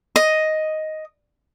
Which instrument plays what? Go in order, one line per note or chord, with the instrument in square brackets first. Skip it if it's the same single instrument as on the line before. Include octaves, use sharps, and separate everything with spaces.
[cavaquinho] D#5